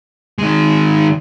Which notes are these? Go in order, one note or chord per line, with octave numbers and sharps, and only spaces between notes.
D#3 G#3